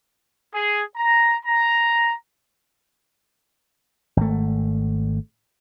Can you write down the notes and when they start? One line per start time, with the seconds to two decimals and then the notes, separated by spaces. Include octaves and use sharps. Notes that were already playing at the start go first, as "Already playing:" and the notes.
0.55 G#4
0.97 A#5
1.46 A#5
4.17 G#1 A3